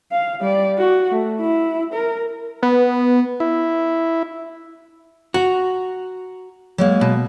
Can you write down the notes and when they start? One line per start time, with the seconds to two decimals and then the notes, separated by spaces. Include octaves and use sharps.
0.11 F5
0.41 G3 D5
0.78 F#4
1.11 A3
1.41 E4
1.94 A#4
2.63 B3
3.40 E4
5.34 F#4 A#5
6.78 F#3 G#3 A#3
7.01 B2